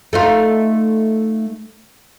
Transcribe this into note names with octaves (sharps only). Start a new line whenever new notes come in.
A3 D#4 F4